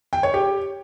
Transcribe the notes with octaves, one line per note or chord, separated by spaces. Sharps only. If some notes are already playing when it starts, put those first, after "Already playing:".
G5
C#5
G4